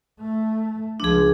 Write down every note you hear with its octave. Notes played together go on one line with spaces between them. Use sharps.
A3
C#2 F3 D4 G#4